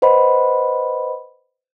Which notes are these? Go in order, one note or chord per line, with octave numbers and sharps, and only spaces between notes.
B4 C5 D#5 F#5 B5